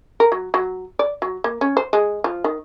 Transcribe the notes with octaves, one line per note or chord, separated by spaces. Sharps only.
A#4
F#3
F#3
D5
F#3
A#3
C#4
C5
G#3
F3
D#3